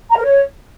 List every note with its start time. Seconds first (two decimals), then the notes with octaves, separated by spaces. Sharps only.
0.10 A#5
0.17 A#4
0.23 C#5